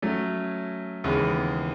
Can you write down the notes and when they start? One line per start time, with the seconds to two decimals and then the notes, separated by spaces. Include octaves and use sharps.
0.02 F#3 A3 C#4
1.04 D#2 C#3 E3 G#3 B3